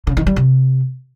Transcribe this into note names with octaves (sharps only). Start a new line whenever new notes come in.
C#3
D#3
G3
C3